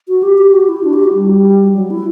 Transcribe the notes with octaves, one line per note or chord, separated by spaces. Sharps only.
F#4
G4
G4
F#4
E4
D4
G4
F#4
G3
F#3
E4